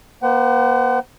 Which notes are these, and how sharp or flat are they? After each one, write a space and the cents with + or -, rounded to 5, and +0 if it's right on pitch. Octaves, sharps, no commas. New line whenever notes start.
A#3 +40 C5 -30 F#5 +35